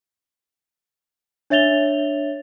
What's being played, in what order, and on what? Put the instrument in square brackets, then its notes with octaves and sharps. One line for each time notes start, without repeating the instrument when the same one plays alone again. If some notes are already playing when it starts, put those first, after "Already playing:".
[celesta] D4 C#5 E5 A6 F7 G7